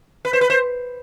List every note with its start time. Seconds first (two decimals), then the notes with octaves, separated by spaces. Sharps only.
0.25 B4
0.33 C5
0.41 B4
0.50 C5